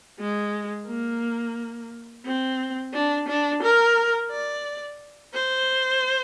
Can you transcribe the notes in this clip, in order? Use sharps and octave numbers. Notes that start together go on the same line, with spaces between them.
G#3
A#3
C4
D4
D4
A#4
D5
C5